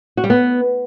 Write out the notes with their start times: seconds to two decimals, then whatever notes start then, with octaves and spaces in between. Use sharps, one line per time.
0.17 F#4
0.24 G3
0.30 B3